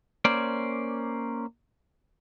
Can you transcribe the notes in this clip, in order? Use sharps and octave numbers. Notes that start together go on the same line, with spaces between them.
A#3 C#4 C5 D5